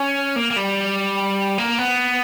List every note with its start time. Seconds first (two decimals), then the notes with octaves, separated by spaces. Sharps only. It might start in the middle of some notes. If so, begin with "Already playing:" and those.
Already playing: C#4
0.36 A#3
0.51 A#3
0.56 G3
1.58 A#3
1.78 B3